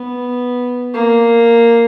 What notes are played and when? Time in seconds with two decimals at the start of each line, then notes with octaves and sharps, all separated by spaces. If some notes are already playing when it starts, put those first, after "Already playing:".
Already playing: B3
0.94 A#3